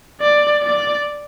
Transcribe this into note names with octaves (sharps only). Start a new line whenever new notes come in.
D5
D5